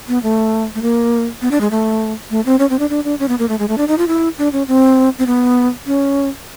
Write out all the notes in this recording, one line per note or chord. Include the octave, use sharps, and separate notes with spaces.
B3
A3
A3
A#3
B3
D4
G#3
A3
A3
C4
C#4
C4
D4
D4
D4
C#4
B3
A#3
A3
G#3
A3
D4
D#4
F4
E4
D4
C#4
C4
C4
B3
C#4